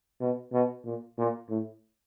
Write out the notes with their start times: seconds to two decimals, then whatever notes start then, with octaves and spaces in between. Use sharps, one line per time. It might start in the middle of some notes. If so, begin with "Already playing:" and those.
0.21 B2
0.53 B2
0.85 A#2
1.18 A#2
1.49 A2